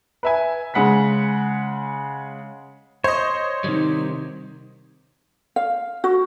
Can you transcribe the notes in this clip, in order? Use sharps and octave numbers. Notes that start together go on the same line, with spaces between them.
B4 E5 G#5
C#3 G#3 F#5 B5 B6
C5 C#5 D#5
C3 D#3 G3 D#4
F5
F#4